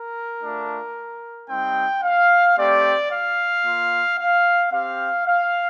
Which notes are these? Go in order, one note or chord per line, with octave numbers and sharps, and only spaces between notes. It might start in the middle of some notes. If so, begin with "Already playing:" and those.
Already playing: A#4
A3 D4 F4
G3 C4 D#4 G5
F5
A3 C4 G4 D5
F5
A#3 F4
F5
C4 G4 F5
F5